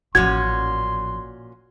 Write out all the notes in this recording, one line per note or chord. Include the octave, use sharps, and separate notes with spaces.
A1 A#2 F3 C#4 F#4 C6 G#6